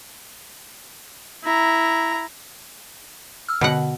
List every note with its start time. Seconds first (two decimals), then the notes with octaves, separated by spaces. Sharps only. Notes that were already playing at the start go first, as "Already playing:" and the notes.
1.44 E4 A#5
3.49 E6 F6
3.61 B2 D3 F#5